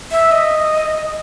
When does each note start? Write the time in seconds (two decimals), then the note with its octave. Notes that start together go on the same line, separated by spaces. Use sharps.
0.11 E5
0.32 D#5